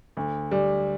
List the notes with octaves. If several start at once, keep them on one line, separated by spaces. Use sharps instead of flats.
D2
D2 G3